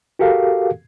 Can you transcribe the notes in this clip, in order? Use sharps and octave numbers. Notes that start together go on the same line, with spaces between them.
F#4 G4 A4 A#4 F5